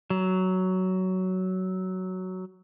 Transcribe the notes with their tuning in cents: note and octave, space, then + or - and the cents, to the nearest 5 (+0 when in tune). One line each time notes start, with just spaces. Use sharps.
F#3 +10